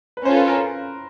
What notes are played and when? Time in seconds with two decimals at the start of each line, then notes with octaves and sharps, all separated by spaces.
0.17 B4
0.25 C#4 F4 A4 C5
0.36 B4
0.48 A#4